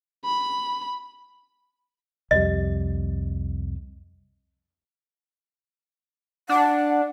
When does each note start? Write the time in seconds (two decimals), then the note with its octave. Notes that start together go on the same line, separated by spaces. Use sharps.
0.24 B5
2.31 C2 F2 G3 D#5
6.49 D4 F#5